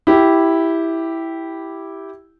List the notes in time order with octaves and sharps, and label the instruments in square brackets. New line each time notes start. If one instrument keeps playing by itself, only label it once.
[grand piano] E4 G4